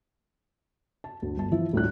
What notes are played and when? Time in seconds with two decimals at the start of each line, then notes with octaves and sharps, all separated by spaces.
1.04 A5
1.22 D2
1.37 G1 A5
1.52 E3 F3 E4 E5
1.73 D2 A2 G3 F4 F#6